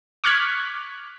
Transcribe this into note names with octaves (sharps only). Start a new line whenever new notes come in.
C#6 D6 F6 F#6 G#6 B6